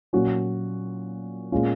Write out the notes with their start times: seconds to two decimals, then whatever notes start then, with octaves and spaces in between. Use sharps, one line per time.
0.13 A#2 F#3 C#4 F#4
1.52 A#2 G#3 C#4 F4